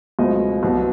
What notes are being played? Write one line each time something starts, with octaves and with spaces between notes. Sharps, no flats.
C#2 B2 F#3 A3 C4 D#5
C2 B2 F#3 B3